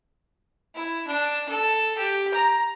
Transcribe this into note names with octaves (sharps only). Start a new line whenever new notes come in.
E4
D4
A4
G4
A#5